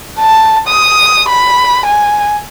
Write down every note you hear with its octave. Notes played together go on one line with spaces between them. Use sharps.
A5
D#6
B5
G#5